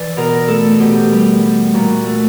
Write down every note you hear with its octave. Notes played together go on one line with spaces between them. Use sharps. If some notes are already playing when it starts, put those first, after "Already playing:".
Already playing: E3 D5
B2 A#4
A3 A4
B2 G4
G3
G3
A#2 F#4
A3